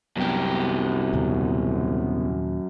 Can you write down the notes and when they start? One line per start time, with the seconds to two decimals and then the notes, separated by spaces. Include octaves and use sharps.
0.17 C2 F#2 B3 G4
1.13 D#2 A#2 C#3